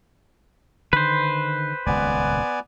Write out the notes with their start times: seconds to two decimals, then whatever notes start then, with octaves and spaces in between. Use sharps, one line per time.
0.93 D3 D#3 B4 C5
1.86 D#1 C#2 A#2 B3 D5 G#5